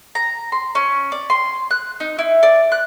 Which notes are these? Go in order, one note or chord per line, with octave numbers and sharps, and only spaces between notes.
A#5
C6
C#4
D5
C6
F#6
D#4
E4
D5
F#6